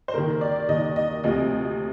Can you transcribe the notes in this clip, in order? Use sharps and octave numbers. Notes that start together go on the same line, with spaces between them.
C5
D#2 D#3 A#4
D5
D#2 D#3 D#5
D#5
D2 C3 F3 D#5